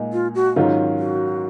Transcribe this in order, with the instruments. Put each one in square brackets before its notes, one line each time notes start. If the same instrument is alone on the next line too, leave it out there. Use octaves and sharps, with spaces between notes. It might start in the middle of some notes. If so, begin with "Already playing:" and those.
Already playing: [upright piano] A#2 G#3 D#4
[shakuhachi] F4
F#4
[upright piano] G#2 D#3 F#3 C#4 F4
[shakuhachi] F#4